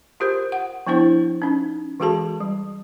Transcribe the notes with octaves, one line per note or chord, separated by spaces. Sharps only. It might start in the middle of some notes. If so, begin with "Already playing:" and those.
F4 G4 A#4 C5
F#5
F3 B3 D4 E4 C5
C#4 D#4
E3 G#3 F#4 G#4 A4 A5
G3